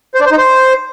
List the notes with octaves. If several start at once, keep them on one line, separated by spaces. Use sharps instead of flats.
C5
D4
C5
D#4
C5